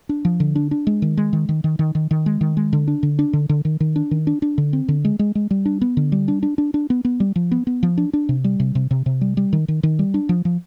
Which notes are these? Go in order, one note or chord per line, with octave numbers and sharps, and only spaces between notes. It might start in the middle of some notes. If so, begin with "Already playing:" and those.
D4
F3
D3
D4
D4
G#3
D#3
G#3
D#3
D#3
D#3
D#3
D#3
D#3
G#3
D#3
G#3
D3
D4
D3
D4
D3
D3
D#3
D#3
D4
D#3
D4
D4
D3
C4
D3
G#3
G#3
G#3
G3
D4
B3
D3
G3
D4
D4
D4
D4
B3
B3
G3
F3
B3
B3
F3
D4
D4
C3
G3
C3
C3
C3
C3
G3
G3
D#3
D#3
D#3
G3
D4
F3
F3